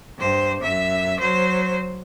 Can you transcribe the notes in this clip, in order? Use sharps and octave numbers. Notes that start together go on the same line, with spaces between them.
G2 C5
F#2 E5
F#3 C5